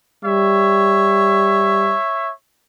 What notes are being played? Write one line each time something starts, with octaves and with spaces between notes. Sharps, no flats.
G3 C#5 E5